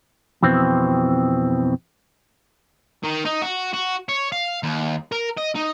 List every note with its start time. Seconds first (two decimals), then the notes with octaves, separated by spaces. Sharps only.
0.43 F2 B2 E3 C4
3.04 D#3
3.26 D#4
3.42 F#4
3.74 F#4
4.09 C#5
4.32 F5
4.63 D#2
5.12 A#4
5.37 D#5
5.55 D#4